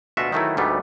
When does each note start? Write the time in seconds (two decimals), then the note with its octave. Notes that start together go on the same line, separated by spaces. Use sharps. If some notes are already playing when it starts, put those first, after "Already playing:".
0.17 D2 B2 F4 F#4 E5
0.32 D#3 E3 F#3 A3 D#4 E4
0.57 D2 G#2 G3 A3 B3